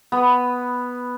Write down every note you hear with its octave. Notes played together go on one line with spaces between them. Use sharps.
B3